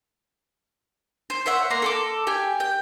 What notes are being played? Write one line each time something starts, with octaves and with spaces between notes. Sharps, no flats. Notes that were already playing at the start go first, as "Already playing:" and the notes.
C5
C5 C#5 E5 F#5
A#3 A#5 C6
A4 C6 D6
G4 G#5
G5